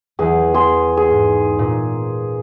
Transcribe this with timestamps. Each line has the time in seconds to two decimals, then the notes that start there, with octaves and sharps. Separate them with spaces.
0.19 E2 E3 G#4
0.54 G#4 C6
0.97 G#4
1.10 G#2
1.59 A#2